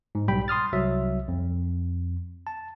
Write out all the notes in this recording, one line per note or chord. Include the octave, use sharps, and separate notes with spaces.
G#2
B1 G3 G5 B5
C6 D#6 F6 A6
C2 F#3 E5
F2
A5